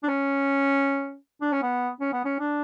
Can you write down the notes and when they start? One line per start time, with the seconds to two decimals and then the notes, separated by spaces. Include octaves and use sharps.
0.03 D4
0.08 C#4
1.41 D4
1.52 C#4
1.62 B3
2.01 C#4
2.13 B3
2.25 C#4
2.39 D4